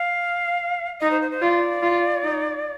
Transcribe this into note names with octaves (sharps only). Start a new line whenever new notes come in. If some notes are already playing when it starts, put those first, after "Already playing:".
Already playing: F5
D#4 D#5
C5
C5
C5
F4 D5
F4
D#4